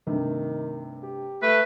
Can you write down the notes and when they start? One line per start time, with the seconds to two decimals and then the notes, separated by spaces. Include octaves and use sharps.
0.07 G2 C3 D#3 A3
1.03 G4
1.42 A3 B4